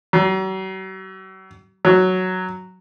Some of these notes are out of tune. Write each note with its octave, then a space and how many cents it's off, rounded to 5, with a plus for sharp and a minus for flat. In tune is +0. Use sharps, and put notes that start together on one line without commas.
F#3 +40
F#3 +0